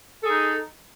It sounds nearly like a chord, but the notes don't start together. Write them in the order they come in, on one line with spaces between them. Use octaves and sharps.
A4 G#4 D#4